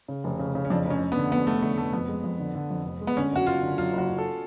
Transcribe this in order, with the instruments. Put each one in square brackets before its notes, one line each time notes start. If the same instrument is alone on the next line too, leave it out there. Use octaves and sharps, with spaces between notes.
[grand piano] C#3
F1
C#3
C#3
[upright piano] C#4
[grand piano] F2 [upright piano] D4
[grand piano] F1
[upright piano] C#4
[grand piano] F1
[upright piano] B3
[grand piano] D3
[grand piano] F1 [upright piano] B3
[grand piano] F1 [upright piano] A3
[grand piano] D3 [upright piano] A3
[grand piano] F1 [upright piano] A3
[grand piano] F2 [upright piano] B3
[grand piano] G#3
F2
D3
D3
F2
F1
G#3
[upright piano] B3
[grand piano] D3 [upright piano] C#4
[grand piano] F#1 [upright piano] F#4
[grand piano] F#1 [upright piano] F4
[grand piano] D3
[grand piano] F#2 [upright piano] F4
[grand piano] F#1 [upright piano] F#4
[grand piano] F#1
[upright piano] A4